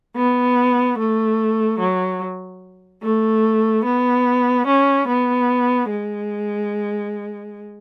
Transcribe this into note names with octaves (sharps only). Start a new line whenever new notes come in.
B3
A3
F#3
A3
B3
C#4
B3
G#3